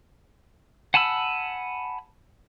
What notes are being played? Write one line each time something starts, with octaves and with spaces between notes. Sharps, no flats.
F#5 G#5 A5 B5 E6